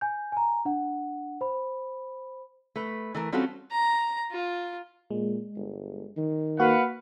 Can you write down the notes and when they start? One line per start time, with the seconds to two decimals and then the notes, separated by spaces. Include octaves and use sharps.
0.01 G#5 G6
0.32 G#5 A#5
0.65 D4 F#5
1.41 C5 B5
2.76 A3 B4
3.15 E3 A3 A#4
3.32 G3 C4 C#4 F4 F#4 A4
3.71 A#5
4.31 F4
5.11 A#2 G#3
5.55 G1
6.17 D#3
6.60 A#3 F#4 B4 F5 F#5